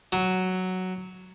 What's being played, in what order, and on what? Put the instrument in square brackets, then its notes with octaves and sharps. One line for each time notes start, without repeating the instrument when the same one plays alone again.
[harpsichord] F#3